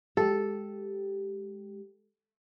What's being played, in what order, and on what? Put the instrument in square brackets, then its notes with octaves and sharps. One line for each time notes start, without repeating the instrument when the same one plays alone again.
[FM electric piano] G#3 G4 [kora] A4